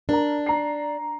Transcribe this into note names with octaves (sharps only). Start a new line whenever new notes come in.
D4 A#4 A#5
A#5 C7